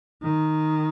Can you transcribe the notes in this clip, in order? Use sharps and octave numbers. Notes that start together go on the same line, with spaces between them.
D#3